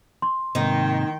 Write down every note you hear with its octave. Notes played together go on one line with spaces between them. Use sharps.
C6
G#2 C3 D#3 A#3 D#4 D#5 G5